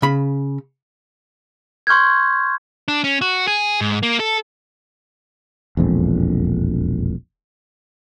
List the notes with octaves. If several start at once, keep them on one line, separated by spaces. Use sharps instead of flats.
C#3 B5
C6 C#6 F6 G6 G#6
D4
C#4
F#4
G#4
G#2
A#3
A4
E1 A#1 F2